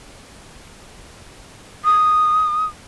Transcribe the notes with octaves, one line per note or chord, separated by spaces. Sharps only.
D#6